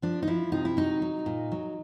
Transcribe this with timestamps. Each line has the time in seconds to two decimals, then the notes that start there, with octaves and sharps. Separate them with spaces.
0.02 F3 D4
0.23 D#4
0.27 F3 E4
0.52 C3 D#4
0.65 E4
0.77 F#3 D#4
1.02 F#3
1.26 A#2
1.52 F#3